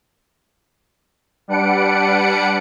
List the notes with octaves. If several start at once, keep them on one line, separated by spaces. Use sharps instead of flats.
G3 D4 B4 F#5 C#7 D7